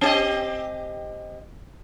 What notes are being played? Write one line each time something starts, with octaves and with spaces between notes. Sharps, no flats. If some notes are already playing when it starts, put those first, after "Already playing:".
C4 G4 D#5